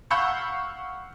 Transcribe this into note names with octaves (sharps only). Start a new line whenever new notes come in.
F5 F#5 B5 C#6 E6 G6